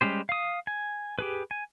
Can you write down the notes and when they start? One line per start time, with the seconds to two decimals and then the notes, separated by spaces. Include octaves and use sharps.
0.01 G3 G#3 C#4 G4 C5
0.29 F5 D#6
0.67 G#5
1.19 G4 G#4 B4
1.51 G#5